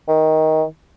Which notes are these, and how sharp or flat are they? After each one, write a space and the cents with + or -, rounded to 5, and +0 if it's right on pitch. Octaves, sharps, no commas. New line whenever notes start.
D#3 +15